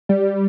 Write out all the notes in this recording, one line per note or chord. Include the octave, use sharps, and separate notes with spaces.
G3